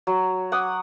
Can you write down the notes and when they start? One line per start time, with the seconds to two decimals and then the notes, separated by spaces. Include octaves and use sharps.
0.07 F#3
0.52 F#5 D6 D#6